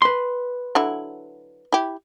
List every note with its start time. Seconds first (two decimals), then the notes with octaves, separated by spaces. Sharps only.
0.02 B4 C6
0.75 D3 F#3 E4
1.72 E4 G4